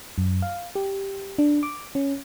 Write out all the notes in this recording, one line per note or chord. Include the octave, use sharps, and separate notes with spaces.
F#2
F5
G4
D4
D6
C#4